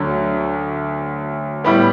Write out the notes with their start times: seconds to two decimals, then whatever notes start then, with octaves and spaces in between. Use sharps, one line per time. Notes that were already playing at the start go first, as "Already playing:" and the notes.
Already playing: D2 D3 F#3
1.64 A2 G3 B3